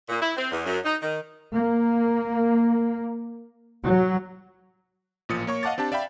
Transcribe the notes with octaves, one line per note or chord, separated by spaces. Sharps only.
A#2
E4
C4
E2
F#2
D#4
D#3
A#3
F#3
A1 A#2 F3 D#6 C#7
A#3 C#5 C#6
D#5 F5 F#5 A5 D6 A6
C4 D4 G4 A5
D5 E5 F5 G5 B5